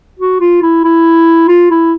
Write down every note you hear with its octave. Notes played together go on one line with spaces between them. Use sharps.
F#4
F4
E4
E4
F4
E4